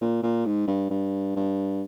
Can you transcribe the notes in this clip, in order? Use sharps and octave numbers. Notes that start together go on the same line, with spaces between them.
A#2
A#2
G#2
G2
G2
G2